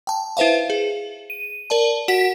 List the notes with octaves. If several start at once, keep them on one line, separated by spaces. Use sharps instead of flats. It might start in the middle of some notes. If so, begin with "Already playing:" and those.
G5 A5
E4 B4 C5 E5 F5
G#4
D#7
A#4 D5 A5
F#4 F#5 B6